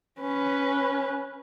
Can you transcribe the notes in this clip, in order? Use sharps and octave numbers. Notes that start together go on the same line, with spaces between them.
C#4 B4